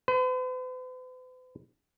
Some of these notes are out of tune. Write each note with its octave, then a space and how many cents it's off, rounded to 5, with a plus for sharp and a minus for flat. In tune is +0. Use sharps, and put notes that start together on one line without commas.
B4 +45